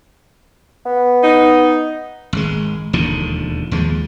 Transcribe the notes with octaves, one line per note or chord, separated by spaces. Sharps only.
B3
D#4
G#1 G#3
E1 D#2 D3 F3
D#2 F3 G#3